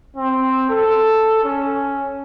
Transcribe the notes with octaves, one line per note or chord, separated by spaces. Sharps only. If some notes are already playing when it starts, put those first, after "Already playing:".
C4
A4
C#4